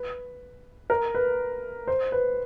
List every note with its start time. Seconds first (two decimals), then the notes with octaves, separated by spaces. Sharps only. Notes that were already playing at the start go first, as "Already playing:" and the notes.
Already playing: B4
0.90 A#4
1.15 B4
1.87 C5
2.12 B4